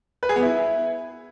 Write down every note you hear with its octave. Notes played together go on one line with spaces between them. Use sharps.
B4
G#4
B3
E4